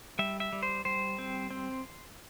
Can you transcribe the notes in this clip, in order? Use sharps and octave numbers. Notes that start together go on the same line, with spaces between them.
G3 E5
E5
G3
C5
G3 C5
C4
C4